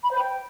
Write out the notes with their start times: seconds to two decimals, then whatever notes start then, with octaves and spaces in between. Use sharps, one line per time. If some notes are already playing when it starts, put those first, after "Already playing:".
0.03 B5
0.11 C5
0.18 G5